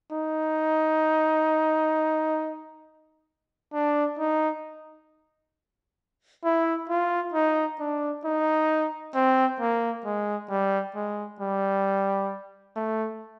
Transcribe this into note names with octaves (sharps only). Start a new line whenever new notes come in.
D#4
D4
D#4
E4
F4
D#4
D4
D#4
C4
A#3
G#3
G3
G#3
G3
A3